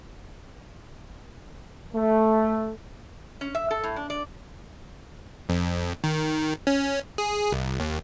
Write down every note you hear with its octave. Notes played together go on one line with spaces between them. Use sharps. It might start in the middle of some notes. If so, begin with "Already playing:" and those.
A3
C#4
E5
A4
A2
D4
D5
F2
D#3
C#4
G#4
C2
D#2